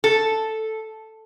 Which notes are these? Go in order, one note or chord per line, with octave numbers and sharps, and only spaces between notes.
A4